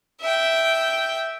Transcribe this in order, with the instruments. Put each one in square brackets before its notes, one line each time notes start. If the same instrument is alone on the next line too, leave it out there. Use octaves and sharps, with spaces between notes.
[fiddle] E5 G5